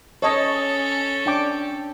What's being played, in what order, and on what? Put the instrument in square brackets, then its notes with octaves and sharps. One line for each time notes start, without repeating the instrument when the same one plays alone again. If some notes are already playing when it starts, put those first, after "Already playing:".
[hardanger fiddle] C#4 A4 [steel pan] C#5 D#5 A5
[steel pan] D4 G5 D6